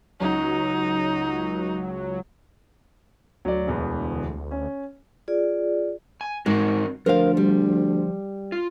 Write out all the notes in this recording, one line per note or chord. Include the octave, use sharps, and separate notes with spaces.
C#2 F#3 D#4
D2 F#3 D5
E1 E2 B3
C#4
F4 G#4 D5
G#5
G#2 C4 F#4 A#4
D2 F3 A#4 C5 F5
G3
F4